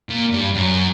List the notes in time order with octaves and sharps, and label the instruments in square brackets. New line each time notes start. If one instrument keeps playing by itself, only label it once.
[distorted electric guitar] A#2
G2
F#2